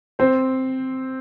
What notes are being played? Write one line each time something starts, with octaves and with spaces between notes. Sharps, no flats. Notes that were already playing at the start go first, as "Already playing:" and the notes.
C4 C5